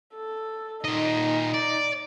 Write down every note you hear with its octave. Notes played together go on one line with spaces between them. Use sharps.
A4
A#2 D#4 D#5
D5